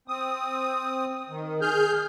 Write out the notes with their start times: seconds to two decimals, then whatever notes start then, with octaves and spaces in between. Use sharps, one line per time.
0.08 C4 D#6
1.29 D#3
1.61 G#4 F6 G6